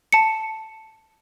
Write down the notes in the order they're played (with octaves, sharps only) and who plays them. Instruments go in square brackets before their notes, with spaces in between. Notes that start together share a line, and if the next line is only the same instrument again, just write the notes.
[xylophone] A5 C#7